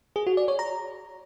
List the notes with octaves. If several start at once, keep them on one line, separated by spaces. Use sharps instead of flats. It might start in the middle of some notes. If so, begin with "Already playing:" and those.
G#4
F#4
D5
C#5
A#5